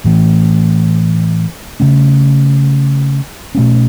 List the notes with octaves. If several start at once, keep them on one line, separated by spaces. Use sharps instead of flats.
A2 E3 A3
C#3 A3 C#4
B2 A3 C#4